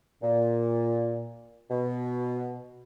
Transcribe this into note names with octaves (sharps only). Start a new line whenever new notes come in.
A#2
B2